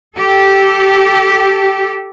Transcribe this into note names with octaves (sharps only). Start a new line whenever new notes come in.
G4 A4